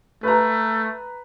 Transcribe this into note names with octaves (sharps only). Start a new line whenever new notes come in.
A3 B4 A#5